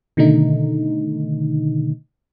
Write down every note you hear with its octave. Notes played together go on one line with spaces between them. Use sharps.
B2 D3 D#3 A3 D#4